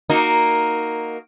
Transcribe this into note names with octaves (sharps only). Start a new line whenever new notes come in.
A#3 D#4 F#4